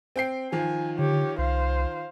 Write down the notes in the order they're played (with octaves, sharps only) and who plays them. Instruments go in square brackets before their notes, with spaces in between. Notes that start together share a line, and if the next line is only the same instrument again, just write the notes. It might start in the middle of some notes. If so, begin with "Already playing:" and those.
[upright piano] C4 G5 C7
[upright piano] D#3 F3 [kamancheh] G#5
[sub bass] D3 [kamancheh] G4 C#5
[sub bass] C2 [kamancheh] C5 F5